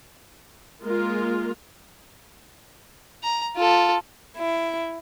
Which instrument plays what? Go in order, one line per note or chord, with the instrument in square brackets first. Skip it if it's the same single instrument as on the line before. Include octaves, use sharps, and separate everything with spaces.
[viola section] G#3 A#3 F4 A#4
[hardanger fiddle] A#5
F4 A4
[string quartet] E4